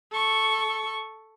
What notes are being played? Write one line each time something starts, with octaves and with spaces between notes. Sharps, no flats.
A4 C#6